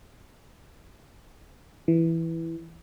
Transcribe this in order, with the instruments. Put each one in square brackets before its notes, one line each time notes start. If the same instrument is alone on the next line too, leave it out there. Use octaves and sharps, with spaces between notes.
[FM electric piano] E3